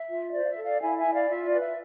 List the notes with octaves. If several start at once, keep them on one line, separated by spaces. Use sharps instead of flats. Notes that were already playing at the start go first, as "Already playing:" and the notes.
Already playing: E5
F4
C5 D5
F5
E5
A4
D5 F5
E4 E5 G#5
E5 G#5
E4
D5 F5
F4 E5
D5
B4
E5